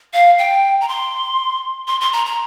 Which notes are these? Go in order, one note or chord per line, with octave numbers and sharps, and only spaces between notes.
F5
G5
A#5
C6
C6
C6
A#5
A#5